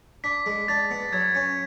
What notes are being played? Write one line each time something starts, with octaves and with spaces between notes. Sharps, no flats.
D4 B6
G#3
D4 A6
B3
F#3 G#6
C#4